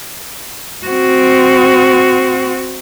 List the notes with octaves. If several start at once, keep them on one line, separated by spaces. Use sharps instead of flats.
C4 F#4